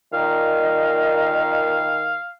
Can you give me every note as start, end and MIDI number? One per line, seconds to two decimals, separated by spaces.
0.13 1.93 46
0.13 2.18 51
0.13 1.58 75
0.13 2.33 77